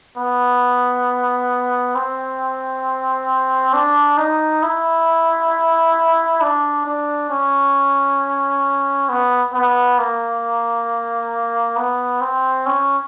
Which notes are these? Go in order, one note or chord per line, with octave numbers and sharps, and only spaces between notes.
B3
C4
D4
D#4
E4
D4
D4
C#4
B3
B3
A#3
B3
C4
C#4